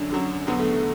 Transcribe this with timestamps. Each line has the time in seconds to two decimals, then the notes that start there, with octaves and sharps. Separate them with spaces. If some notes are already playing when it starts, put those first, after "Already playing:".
Already playing: F#2 D3 F#3 D4
0.10 F#2 D3 F#3
0.47 E2 D3 F#3 B3
0.59 A3
0.72 A3